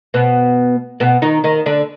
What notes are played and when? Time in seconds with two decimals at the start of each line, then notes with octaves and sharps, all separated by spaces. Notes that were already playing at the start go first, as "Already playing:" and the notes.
0.14 B2 B3
1.00 B2 B3
1.22 D#3 D#4
1.44 D#3 D#4
1.66 D3 D4